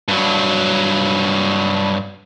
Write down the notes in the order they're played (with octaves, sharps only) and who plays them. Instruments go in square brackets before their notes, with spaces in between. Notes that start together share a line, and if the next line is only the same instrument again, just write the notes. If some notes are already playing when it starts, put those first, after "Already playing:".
[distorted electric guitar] G2 F#3